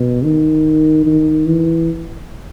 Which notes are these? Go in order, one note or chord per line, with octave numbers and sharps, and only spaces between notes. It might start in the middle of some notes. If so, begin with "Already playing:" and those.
Already playing: B2
D#3
D#3
E3